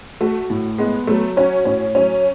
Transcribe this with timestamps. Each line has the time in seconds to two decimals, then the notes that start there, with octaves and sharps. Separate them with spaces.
0.21 A3 F#4
0.50 A2
0.78 G#3 B3
1.07 F#3 A3
1.37 C#4 F#4
1.65 A2 C#4
1.95 F#3 C#4